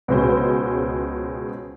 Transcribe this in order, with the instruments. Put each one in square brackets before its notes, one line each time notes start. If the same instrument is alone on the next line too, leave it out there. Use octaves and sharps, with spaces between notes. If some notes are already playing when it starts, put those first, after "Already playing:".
[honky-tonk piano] C#2 B2 G#3 C#4 C5